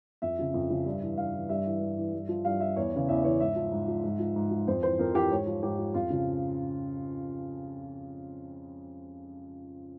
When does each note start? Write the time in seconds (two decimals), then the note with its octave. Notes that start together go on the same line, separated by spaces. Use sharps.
0.22 F2 E5
0.38 C#3 F3
0.54 F2
0.70 C#3 F3
0.86 G2
1.02 E3
1.17 G2 F5
1.34 E3
1.49 G2 E5
1.65 E3
1.81 G2
1.97 E3
2.13 G2
2.29 F3
2.45 G2 F5
2.60 F3 E5
2.76 E2 C#5
2.93 C#3 E3
3.08 E2 E5
3.24 C#3 E3 C#5
3.40 G#2 E5
3.56 F3
3.72 G#2
3.88 F3
4.04 G#2
4.19 F3
4.36 G#2
4.51 F3
4.67 F2 C5
4.83 E3 C5
4.99 F2 A#4
5.15 E3 G4
5.31 G#2 C#5
5.47 F3
5.63 G#2 G4
5.79 F3
5.94 F2 F4
6.10 C#3 F3